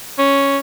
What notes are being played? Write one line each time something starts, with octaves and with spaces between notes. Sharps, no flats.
C#4